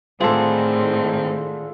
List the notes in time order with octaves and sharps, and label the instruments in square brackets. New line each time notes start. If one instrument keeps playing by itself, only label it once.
[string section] A2 D#3 [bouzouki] D3 G#4 [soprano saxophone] C4 [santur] F4 A4